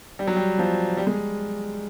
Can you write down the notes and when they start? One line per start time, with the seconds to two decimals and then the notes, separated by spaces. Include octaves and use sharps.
0.19 G3
0.27 F#3
0.36 G3
0.59 F3
0.97 G3
1.07 G#3